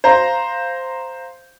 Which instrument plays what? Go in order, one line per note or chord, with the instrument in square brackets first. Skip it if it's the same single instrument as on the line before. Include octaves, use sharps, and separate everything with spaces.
[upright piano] C5 F5 A#5